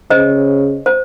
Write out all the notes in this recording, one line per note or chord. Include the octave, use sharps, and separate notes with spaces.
C#3 C5 D#5
C5